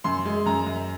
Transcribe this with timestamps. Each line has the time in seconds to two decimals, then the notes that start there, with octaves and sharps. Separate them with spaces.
0.04 F#2 C6
0.25 G#3
0.46 F#2 A#5
0.66 F#2